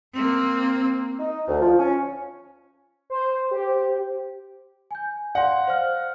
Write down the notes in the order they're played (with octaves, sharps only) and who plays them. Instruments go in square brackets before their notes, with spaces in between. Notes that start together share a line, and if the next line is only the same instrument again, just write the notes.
[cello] A#3 C4
[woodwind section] D#4
D2
F3
C#4
[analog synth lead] C5
[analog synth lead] G4 [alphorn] C5
[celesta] G#5 G6
[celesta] D5 F5 C6 [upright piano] F#5
[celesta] C5 F5 F6